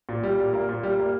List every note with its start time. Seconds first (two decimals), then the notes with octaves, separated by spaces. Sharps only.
0.09 A#2
0.23 G3
0.40 A#2
0.54 A#3
0.69 A#2
0.83 G3
0.99 A#3